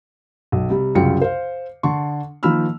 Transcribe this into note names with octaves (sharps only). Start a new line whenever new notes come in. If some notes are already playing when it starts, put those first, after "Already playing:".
B1
C3 G3
C2 F#2 C#3 F4 G5 C#7
C5 F5
D3 D4 C6 C#6
D#3 F3 A#3 B5 E6 F6